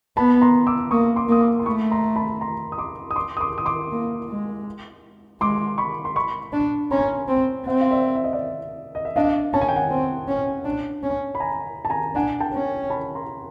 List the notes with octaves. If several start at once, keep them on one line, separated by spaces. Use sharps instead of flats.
B3 A5 B5
A#5 C6
D6 E6
A#3 C#6 D#6
C6 D6
A#3 D#6
C6 D6
C6
A3 B5 C#6
A#5 C6
A5 B5
A#5 C6
D#6
C6 D6
D#6
C6 D6
D#6
C6 D6
D#6
C6 D6
A#3
G#3
G#3 C6 D6
B5 C#6
C6
B5 C#6
D4
C#4 A#5 C6
C4
C4 E5 F#5
F5
D5 E5
E5
D#5
D5 E5
D#5
E5
D4 D#5 F5
C#4 A5
G#5
G5
F#5 G#5
C4
C#4
D4
C#4
B5
G#5 A#5
A5
G#5 A#5
D4 F#5 G#5
G5 A5
C#4
A5 B5
A#5 C6